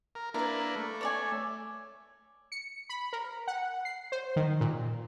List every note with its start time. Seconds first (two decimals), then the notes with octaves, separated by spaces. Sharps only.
0.15 A#4
0.34 A#3 D4 E4 A#4 B4
0.76 A3
1.01 C#5 D5 G#5
2.52 C#7
2.89 B5
3.13 A#4
3.47 F#5
3.85 C7
4.12 C5
4.36 D#3
4.61 A#2